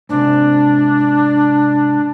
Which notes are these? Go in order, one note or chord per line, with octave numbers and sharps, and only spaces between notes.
G#2 C3 D4